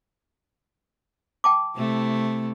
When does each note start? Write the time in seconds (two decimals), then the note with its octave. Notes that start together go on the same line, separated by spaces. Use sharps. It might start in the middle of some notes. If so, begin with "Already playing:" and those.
1.44 G5 A5 D6
1.76 C3 A3 E4